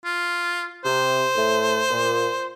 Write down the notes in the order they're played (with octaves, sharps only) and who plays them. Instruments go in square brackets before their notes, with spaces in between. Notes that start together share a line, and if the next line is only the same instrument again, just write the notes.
[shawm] F4
[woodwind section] C3 [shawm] C5
[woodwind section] A2 A3
A#2